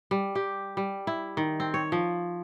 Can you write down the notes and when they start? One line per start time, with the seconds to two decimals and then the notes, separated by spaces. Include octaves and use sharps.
0.11 G3
0.35 G4
0.77 G3
1.07 E4
1.37 D#3
1.60 C4
1.74 C#5
1.92 F3